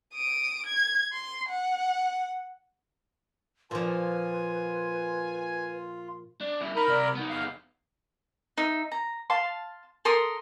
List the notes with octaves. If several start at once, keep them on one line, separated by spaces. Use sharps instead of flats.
D#6 D7
G#6
C6
F#5
A#2 F3 F4 B4 G#5
D4
C#3 E4
D#4 A#4 B5
C3 D5
B3 D#4
E2 F5
D#4 E5
A#5
F5 A5 C6
A4 A#4 C6 D#6